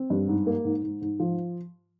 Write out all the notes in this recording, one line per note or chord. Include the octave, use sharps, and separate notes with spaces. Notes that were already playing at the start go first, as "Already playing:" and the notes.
Already playing: C4
G2
G#2
A#3
G#2
G#2
G#2
F3